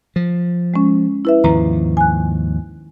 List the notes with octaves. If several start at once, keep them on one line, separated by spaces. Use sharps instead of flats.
F3
G#3 C#4
E4 B4 E5
D#2 G#2 F3 A#5
G#5 F#6